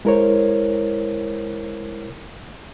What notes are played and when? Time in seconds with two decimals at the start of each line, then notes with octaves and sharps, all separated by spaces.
0.05 G#3 E4 A#4 C5 C#5